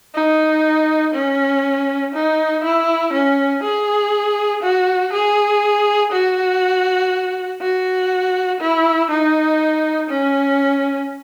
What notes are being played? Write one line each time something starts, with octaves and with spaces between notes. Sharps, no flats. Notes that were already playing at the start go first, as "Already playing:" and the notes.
D#4
C#4
D#4
E4
C#4
G#4
F#4
G#4
F#4
F#4
E4
D#4
C#4